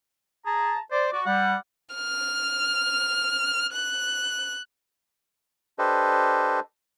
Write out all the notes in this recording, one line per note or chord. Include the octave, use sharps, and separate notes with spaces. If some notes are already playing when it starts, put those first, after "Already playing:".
G#4 A5 A#5
C5 D5
F#4 D5
G3 F#5
F6
F#6
D4 G4 A4 B4 C5 D#5